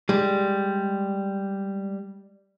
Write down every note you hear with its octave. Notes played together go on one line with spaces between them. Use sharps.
G3 G#3